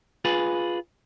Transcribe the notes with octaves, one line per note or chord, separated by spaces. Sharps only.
F4 G#4 B4